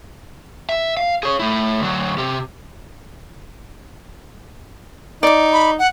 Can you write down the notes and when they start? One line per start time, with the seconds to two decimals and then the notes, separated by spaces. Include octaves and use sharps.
0.69 E5
0.97 F5
1.23 G#4 C#5
1.40 A3 E4
1.79 D2 F#3
2.18 C3 G4
5.23 D#4 D5 D6
5.53 B5
5.79 F#5